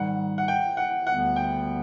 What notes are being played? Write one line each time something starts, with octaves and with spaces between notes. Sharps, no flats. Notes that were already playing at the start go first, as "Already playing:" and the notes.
Already playing: G#2 D#3 G3 F#5
F#5
G5
F#5
D2 D3 G3 B3 F#5
G5